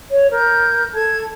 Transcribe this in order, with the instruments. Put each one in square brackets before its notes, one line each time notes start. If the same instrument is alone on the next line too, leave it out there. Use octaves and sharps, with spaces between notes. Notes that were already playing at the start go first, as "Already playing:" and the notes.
[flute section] C#5
A#4 G6
A4 A5 G#6